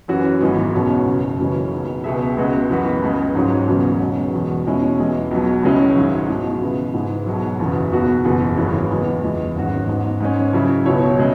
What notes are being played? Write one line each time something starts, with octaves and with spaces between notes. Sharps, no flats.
F#2 E3 C#4 F#4
G#1 F#2 E3 G#3 B3
B1 B2 F#3 C#4
F#1 F#2 C#3
F#2 C#3 E3 G#3 C#4
B1 B2 B3
C#2 B2 B3 G#4 E5
C#2 C#3 G#3 B3 F#4
F#2 E3 B3 F#4 B4
C#2 C#3 G#3
G#2 F#3 C#4
E1 E2 C#3 F#3 B3
B1 B2 G#3 C#4
E1 E2 B2
B1 B2 G#3 C#4 E4
E2 E3 G#3
B1 B2 F#3
C#2 C#3 G#3 C#4 E4
G#1 G#2 F#3
B2 G#3 E4
C#3 E3 B3 E4
G#2 G#3 E4 G#4
B1 B2 F#3
F#1 E2 C#3 E3 B3
B1 B2 B3 F#4
F#1 E2 E3 B3 G#4
G#1 F#2 C#3 E3 C#4
E2 E3 G#3
F#1 E2 E3 G#3 E4
G#1 G#2 F#3 C#4 F#4
G#2 G#3 B3
G#2 G#3 C#4
C#3 F#3 E4
C#2 B2 B3 E4 C#5
C#3 G#3